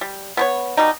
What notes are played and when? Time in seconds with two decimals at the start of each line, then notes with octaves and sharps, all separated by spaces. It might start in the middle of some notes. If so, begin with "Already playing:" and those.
0.01 G3
0.37 B3 C5 C#5
0.77 B2 G3 D#4